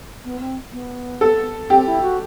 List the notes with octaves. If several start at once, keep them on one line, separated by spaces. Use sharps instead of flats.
B3
C4
B3
A4
C4 G4
E4
F#4